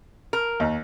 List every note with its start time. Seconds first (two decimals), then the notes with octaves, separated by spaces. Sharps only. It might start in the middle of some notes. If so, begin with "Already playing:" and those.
0.33 A#4
0.60 D#2